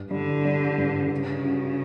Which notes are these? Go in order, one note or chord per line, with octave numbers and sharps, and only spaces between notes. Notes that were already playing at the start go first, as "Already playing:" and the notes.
Already playing: G2
D3 G3
G3
G2
C#3 C#4
F#4